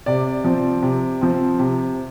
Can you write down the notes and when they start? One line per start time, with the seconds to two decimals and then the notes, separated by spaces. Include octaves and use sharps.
0.06 C3 D5
0.45 F3 C4
0.82 C3
1.21 F3 C4
1.59 C3